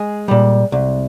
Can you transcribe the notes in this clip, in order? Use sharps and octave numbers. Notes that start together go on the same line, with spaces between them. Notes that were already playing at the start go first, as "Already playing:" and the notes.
Already playing: G#3 G#4
A#2 G3
C2